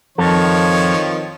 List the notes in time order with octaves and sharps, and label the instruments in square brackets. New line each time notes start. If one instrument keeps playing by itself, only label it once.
[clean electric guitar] F2 A4 [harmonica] D#3 F3 C#5